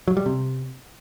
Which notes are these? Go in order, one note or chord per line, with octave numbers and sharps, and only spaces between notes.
F#3
G3
C3